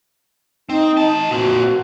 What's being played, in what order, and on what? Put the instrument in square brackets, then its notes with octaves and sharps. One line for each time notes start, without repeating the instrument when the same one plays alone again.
[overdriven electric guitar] C4 [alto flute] D#4
[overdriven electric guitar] E3 A5
[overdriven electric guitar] A#2 C4 [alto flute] F#4